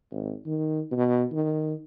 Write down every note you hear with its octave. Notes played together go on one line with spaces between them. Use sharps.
G#1
D#3
B2
D#3